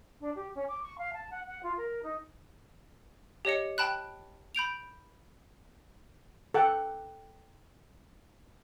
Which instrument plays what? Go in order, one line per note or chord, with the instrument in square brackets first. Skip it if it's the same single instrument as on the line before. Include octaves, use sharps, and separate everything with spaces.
[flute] D4
G4
C#4
D6
C#6
F5
A5
F#5
F#5
F4
A#4
D#4
[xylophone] G4 C#5 D#5 C#7
G5 A5 B5 F#6
B5 G6 D7 F7
[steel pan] A4 F#5 G5